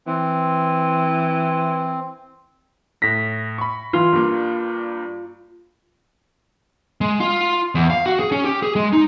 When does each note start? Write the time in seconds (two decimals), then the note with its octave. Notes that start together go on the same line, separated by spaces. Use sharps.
0.07 E3 C4
3.02 A2 A#6 B6
3.58 B5 C#6
3.93 E3 F4
4.13 G2 G3 A#3
7.01 G#3
7.20 F4
7.75 E2
7.90 F5
8.06 F#4
8.19 G#4
8.32 C#4
8.45 G4
8.62 G#4
8.76 G#3
8.93 D#4